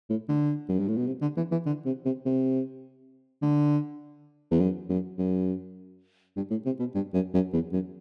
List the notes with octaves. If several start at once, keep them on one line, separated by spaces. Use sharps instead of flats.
A2
D3
F#2
G2
A2
B2
C3
D3
E3
E3
D3
C3
C3
C3
D3
E2
F#2
F#2
F#2
G2
A2
C3
B2
G2
F#2
F#2
E2
F#2